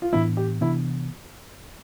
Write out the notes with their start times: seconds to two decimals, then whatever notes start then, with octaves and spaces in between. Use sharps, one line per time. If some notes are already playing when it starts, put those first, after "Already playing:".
0.02 F4
0.13 A2 E3 B3 D4 E4
0.37 G4
0.61 C3 E3 B3 D4 E4